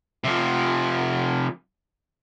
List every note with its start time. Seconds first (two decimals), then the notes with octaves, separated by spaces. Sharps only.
0.24 C3 F3